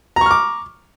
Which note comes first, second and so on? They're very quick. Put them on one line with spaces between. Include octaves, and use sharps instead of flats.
A#5 C#6 F6 D6